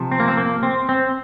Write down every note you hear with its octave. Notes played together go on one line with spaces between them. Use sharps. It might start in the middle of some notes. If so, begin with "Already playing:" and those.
Already playing: C3 F3
C4
A#3
C4
A#3
C4
C4